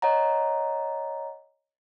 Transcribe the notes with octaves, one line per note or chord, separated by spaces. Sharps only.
C#5 D#5 F#5 A#5